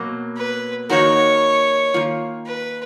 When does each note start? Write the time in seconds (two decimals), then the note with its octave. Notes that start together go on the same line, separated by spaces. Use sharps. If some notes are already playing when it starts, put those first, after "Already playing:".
Already playing: B2 F#3 A#3
0.37 B4
0.89 D#3 A#3 D#4 F#4 A#4 C#5
1.94 D#3 A#3 F4
2.47 B4